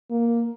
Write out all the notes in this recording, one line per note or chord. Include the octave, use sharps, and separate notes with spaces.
A#3